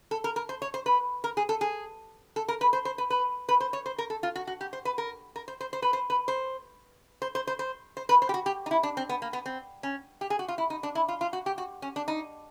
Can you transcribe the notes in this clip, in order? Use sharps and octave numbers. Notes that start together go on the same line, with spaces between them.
A4
A#4
A#4
C5
C#5
C5
B4
A#4
G#4
A4
G#4
A4
A#4
B4
C5
C5
B4
B4
B4
C5
C#5
C5
A#4
A4
F4
F#4
F#4
G4
C5
B4
A#4
A#4
C5
C5
C5
B4
C5
B4
C5
C5
C5
C5
C5
C5
B4
C5
G4
F#4
G4
D#4
E4
D4
C4
B3
A#3
B3
C4
C#4
G4
G#4
F#4
F4
E4
D#4
D4
E4
F4
F4
F#4
G4
F#4
C#4
D4
D#4